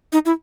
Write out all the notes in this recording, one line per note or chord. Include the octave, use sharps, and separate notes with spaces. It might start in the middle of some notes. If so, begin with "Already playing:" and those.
D#4
E4